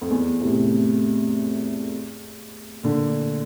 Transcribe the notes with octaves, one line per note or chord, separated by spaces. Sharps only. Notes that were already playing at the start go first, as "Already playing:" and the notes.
F2
E2
A2 C3
A#2 D3